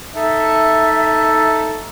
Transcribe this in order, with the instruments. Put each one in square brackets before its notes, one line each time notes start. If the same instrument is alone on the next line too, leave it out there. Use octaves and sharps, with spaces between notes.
[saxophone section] D#4 A4 [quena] E5